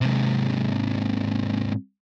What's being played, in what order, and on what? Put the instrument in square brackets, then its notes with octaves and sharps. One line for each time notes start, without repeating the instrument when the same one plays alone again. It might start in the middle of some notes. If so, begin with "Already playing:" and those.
[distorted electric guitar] G#2 C3